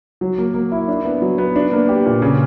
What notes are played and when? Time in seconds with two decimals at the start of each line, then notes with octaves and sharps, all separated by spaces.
0.21 F#3
0.38 A#3
0.54 A#3
0.72 E4
0.88 D4
1.05 B3
1.22 F#3
1.38 B3
1.56 D4
1.72 A#3
1.89 G4
2.06 A#2
2.22 C#3